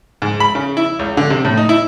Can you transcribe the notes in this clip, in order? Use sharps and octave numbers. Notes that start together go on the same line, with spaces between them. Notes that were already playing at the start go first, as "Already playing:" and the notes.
G#2
B5
C#3
E4
C#2
D3
C3
A2
D#4
E4